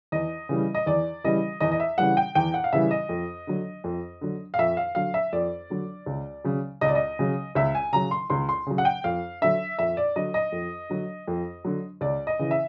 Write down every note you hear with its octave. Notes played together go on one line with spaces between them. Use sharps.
E2 D#5
C#3 E3 G3
D#5
E2 D5
C#3 E3 G3 D#5
E2 D#5
D#5
E5
C#3 E3 G3 F#5
G5
E2 G5
F#5
F5
C#3 E3 G3 E5
D#5
F2
D3 F#3
F2
D3 F#3
F5
F2 E5
F5
D3 F#3 F5
E5
F2 D5
D3 F#3
C#2
C#3 F#3
C#2 D#5
D5
D#5
C#3 F#3
C#2 E5
G#5
C#3 F#3 A#5
C6
C#2 C6
C6
C#3 F#3
F#5
G5
F2 F5
D3 F#3 E5
F2 E5
D5
D3 F#3 D#5
D#5
F2
D3 F#3
F2
D3 F#3
C#2 D5
D#5
C#3 E3
E5